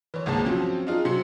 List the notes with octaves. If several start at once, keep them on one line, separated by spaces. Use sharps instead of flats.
E3 C#5
G#1 C#2 A#3 G#4 A5
F3 F#3 C4 C#4
D4 D#4 F4 G#4
C3 F#3 C6 C#7